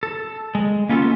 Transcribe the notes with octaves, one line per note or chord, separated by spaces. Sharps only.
A4
G#3
A#3 B3 C#4 F4 A4